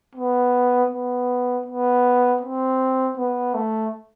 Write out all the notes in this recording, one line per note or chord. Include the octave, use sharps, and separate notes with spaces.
B3
B3
B3
C4
B3
A3